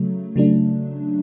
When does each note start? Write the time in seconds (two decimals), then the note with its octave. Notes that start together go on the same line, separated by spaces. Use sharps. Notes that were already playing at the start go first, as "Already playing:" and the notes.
Already playing: C#3 F#3 A3
0.36 C#3 F#3 A3 D4